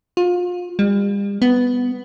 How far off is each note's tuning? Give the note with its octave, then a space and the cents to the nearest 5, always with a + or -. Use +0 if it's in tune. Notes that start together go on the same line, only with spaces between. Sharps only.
F4 +30
G3 +40
B3 +5